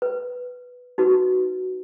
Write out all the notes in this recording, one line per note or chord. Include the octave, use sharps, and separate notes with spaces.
B4
D#4 F#4 B4